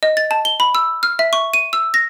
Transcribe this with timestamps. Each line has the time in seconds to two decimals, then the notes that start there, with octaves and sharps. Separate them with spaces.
0.03 D#5
0.17 A6
0.31 A5
0.45 G7
0.60 B5
0.75 E6
1.03 F6
1.19 E5
1.33 C#6
1.54 D#7
1.73 E6
1.94 A#6